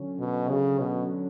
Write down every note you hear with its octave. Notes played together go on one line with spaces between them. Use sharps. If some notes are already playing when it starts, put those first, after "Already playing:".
Already playing: D3 F#3 C#4
B2
C#3
B2